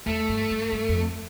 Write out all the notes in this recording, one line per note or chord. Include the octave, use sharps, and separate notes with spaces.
E2 A3
G2
G2
G2
F2